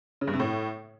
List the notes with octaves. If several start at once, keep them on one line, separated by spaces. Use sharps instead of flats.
C#3
G2
C3
A2